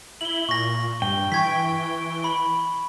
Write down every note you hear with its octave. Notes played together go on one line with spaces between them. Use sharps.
E4 F#7 G7
A#2 C#6 A#6
G2 G5
E3 C#6 G#6 B6
B5